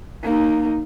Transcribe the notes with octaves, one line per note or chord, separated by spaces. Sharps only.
A#3 D#4